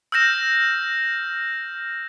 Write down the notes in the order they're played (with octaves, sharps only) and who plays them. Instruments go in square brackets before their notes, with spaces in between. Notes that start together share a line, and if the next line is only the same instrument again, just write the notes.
[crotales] E6 F6 G6 A#6 E7